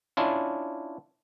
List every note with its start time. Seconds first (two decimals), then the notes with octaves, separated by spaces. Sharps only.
0.17 C#4 D4 E4 F4